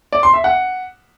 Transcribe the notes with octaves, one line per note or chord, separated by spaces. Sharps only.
D5
C6
E5
F#5